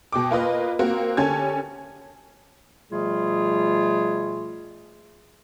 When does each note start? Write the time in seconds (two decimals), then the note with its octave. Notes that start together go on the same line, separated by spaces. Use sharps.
0.12 B2 G5 D6
0.31 A#3 F4 B4 D#5
0.79 A#3 C4 F#4 A#4
1.17 D3 C#4 G4 G#5 A5 G#6
2.91 B2 F3 G3 A3 F4 G#4